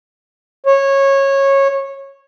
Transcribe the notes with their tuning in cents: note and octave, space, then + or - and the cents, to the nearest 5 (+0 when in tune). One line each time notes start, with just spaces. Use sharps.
C#5 -15